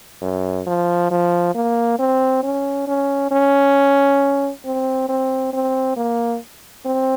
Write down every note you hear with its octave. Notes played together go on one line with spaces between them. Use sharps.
F#2
F3
F3
A#3
C4
C#4
C#4
C#4
C4
C4
C4
A#3
C4